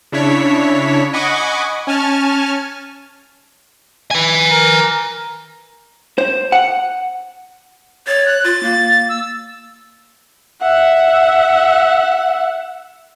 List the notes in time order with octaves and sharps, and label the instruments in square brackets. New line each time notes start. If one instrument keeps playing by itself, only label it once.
[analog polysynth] C#3 D4 E4 C#5 B6
D#5 F#5 G#5 B5 C#6 D6
C#4 G#5 A5 F6
[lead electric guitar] B4 G#5
[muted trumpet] A#4
[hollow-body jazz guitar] C5
F#5
[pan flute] C#5 [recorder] A6
[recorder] F#6
[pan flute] F4 [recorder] A6
[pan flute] A#3
[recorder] E6
[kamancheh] E5 F#5